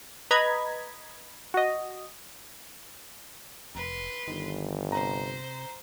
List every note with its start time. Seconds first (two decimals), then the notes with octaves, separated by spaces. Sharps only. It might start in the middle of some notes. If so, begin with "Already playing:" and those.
0.31 B4 D#5 A#5 B5 G#6
1.54 F#4 D#5
3.75 F1 B4 C6
4.28 G1 D#3
4.92 C3 C5 A#5